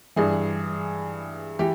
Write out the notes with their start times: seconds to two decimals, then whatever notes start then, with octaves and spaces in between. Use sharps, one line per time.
0.16 G2 E3 G#4
1.59 E3 G4